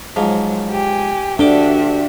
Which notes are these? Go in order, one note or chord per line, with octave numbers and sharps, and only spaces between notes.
G#2 F3 F#3
G4 G#5
D2 D4 F#4 G4 E5 G5 D6